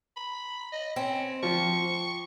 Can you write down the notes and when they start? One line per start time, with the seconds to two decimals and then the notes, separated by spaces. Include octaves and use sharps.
0.16 B5
0.72 D#5
0.96 C4 C#4
1.43 F3 C#6